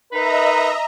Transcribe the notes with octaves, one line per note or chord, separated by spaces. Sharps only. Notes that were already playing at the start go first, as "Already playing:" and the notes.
D#4 A#4 B4 D#5 E5 A#5